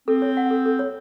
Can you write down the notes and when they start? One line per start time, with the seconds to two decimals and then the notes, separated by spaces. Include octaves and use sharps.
0.08 C4 A4
0.22 C#5
0.37 F#5
0.51 A4
0.66 A4
0.79 C#5